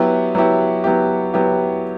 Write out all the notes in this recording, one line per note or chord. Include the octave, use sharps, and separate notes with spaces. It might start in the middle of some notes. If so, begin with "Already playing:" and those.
Already playing: F#3 B3 E4 G4
F#3 B3 E4 G4
F#3 B3 E4 G4
F#3 B3 E4 G4